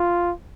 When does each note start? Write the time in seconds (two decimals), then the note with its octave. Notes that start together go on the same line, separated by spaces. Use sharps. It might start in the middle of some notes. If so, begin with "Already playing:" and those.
Already playing: F4